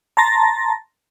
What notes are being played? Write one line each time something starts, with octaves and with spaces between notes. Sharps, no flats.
A5 A#5 C6 A6 A#6